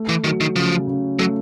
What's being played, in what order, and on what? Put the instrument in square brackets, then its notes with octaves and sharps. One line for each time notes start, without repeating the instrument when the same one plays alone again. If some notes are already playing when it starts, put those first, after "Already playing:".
Already playing: [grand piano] A3
[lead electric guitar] E3
[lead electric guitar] D#3 [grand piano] F#3
[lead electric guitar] D#3
[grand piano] C#3 [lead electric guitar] F3
[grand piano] C#3
[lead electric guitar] F#3 [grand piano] A3